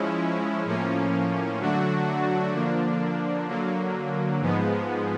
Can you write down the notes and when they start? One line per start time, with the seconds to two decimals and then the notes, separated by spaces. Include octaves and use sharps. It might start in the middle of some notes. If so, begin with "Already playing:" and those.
Already playing: F3 G#3 C#4 E4
0.65 A2 F3 A#3 C#4
1.58 D3 F#3 A3 D4 F#4
2.53 D3 F3 A#3 D4
3.47 D3 F#3 A#3
4.41 G#2 F3 G#3 B3